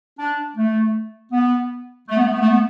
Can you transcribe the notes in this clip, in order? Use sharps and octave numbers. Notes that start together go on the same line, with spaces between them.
D4
A3
B3
A3
B3
A3
B3
A3
B3